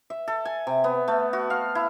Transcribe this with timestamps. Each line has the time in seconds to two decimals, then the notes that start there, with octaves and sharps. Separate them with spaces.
0.10 E5
0.28 A4
0.45 G#5
0.67 C3
0.84 B3
1.08 A3
1.33 F#4
1.50 F5
1.75 E4